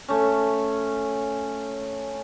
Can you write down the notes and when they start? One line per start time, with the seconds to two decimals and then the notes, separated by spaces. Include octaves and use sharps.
0.08 A3 C#4